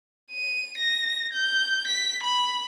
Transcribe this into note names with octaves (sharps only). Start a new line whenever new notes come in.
D#7
A#6
G6
B6
B5